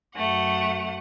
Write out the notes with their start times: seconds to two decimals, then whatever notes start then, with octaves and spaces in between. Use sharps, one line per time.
0.15 F#2 A3 F#5